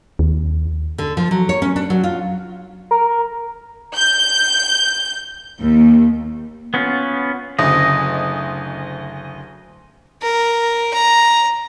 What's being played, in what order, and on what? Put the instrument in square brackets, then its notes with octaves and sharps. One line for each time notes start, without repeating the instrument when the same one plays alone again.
[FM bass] D#2
[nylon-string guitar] D3
F3
F#3
C#5
C#4
D4
F#3
F4
[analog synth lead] A#4
[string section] G6
D#2
[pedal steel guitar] B3 C#4 F4
[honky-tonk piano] F#1 D2 [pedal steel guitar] D#5
[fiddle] A#4
A#5